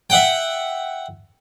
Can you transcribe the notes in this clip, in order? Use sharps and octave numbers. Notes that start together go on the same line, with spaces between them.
E5 F#5 G5